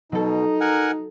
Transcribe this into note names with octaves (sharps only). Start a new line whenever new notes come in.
B2 F#3 D#4 A4
A#4 F#5 G#5